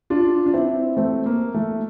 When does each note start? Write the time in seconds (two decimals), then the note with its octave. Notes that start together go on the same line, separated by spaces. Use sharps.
0.10 D4 F4
0.46 D4
0.53 C4 E4
0.97 A3 C4
1.26 A#3
1.54 A3